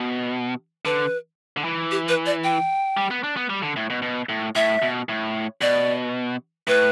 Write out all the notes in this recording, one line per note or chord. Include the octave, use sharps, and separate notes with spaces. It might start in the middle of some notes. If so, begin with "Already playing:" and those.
Already playing: B2
D3 B4
D3
E3
G4
B4
D5
G5
G3
B3
D4
B3
G3
D3
A2
B2
B2
A2
A2 E5
B2
A2
B2 D5
A2 B4